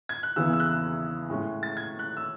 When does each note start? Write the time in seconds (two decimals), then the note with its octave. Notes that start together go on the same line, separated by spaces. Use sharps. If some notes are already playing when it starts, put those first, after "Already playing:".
0.09 G#6
0.23 F#6
0.36 E2 C#3 E3 B3 E6
0.53 E6
0.60 F#6
1.29 A2 G#3 C#4
1.63 A6
1.77 G#6
1.99 F#6
2.17 E6